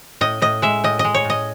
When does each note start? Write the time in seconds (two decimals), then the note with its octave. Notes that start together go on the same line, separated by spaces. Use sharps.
0.21 A2 D#5
0.42 A2 D#5
0.62 G#3 E5
0.84 A2 D#5
0.99 D#5
1.04 G#3
1.14 C#5
1.25 A2
1.30 D#5